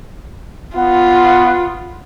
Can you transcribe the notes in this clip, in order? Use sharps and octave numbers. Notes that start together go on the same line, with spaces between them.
B3 F4 F#5